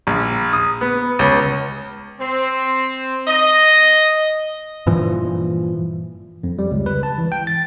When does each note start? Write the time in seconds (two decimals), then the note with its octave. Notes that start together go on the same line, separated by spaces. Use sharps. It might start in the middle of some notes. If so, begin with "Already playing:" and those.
0.07 A#1
0.53 D#6
0.81 B3
1.19 C#2
2.20 C4
3.27 D#5
4.87 G2 A#2 E3 F3
6.43 F2
6.59 G3
6.72 C#2
6.86 B4
7.03 A5
7.18 E3
7.32 G5
7.47 A6